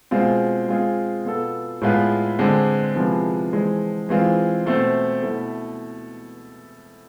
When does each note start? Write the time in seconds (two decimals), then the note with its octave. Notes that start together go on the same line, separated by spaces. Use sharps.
0.11 B2 G#3 C4 F4
0.68 G#3 C4 F4 G#4
1.24 B2 B3 F4 A4
1.81 A2 G#3 B3 F4 B4
2.39 D3 G#3 C4
2.96 C3 F3 G#3 B3 E4
3.53 E3 G#3 C4 G#4
4.09 E3 G#3 C4 F4
4.66 B2 A3 C4
5.22 B2 A3 E4 A4